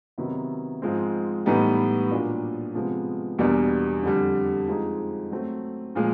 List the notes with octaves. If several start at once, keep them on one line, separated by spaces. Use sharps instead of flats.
C3 D#3 F#3 B3 E4
G#2 F3 G#3 C4
A2 E3 G3 B3 D#4
A#2 F#3 A#3 D4 F4
C3 F3 G#3 B3
E2 B2 G3 A#3 D4
F2 D3 G3
F3 G#3 C4 D#4 G#4
F#3 A3 C4
A#2 F3 G#3